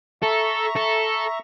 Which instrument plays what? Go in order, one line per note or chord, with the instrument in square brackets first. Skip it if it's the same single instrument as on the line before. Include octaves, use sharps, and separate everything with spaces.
[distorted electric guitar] A4 [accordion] E5 A#5 C#6
[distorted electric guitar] A4